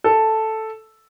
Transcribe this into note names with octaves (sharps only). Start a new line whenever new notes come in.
A4